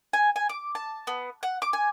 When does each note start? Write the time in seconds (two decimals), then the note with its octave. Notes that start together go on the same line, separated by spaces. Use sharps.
0.13 G#5
0.36 G#5
0.49 D6
0.75 A5
1.07 B3
1.43 F#5
1.62 D6
1.73 G#5